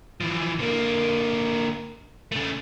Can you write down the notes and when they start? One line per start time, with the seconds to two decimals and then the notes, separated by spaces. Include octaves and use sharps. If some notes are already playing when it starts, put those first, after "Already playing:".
0.21 E3 F3
0.59 D3 A#3
2.32 C#3 A3